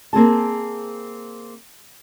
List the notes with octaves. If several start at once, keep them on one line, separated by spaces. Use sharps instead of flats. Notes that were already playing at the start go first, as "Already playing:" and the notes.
A#3 C4 G#4 A5